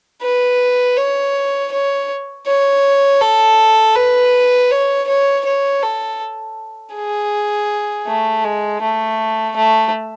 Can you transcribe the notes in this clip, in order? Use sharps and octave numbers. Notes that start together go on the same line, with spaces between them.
B4
C#5
C#5
C#5
A4
B4
C#5
C#5
C#5
A4
G#4
A3
G#3
A3
A3